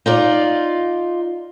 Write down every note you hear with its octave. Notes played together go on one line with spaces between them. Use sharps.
D#4 F4 D5